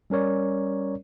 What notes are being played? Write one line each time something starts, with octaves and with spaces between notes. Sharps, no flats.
G3 C#4 A#4 C#5 D5